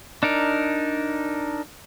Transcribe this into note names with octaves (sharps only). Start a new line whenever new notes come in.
D4 D#4 A#4